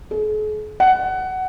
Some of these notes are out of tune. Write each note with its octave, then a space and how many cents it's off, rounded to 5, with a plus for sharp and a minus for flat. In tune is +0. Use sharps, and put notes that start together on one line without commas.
G#4 +45
F#5 +15